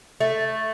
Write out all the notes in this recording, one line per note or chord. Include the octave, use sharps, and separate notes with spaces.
A3